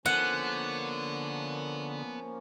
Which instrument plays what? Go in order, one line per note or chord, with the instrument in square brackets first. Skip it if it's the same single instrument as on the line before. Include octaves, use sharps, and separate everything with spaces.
[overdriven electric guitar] D3 [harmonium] F3 A#3 C#4 [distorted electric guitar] B3 [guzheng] F#5